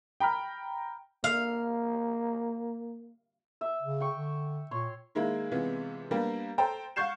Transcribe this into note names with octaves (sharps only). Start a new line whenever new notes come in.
G5 A#5 B5 F6
A#3 F5
E5
C#3
G5 C#6
D3
A#2 C#5 C6 C#6
D#3 G#3 A#3 E4
C3 E3 G#3 B3 C#4 F4
G3 A#3 B3 D4 G4 A#4
A4 C5 G5 A#5
F5 F#5 C#6 G6 C7 E7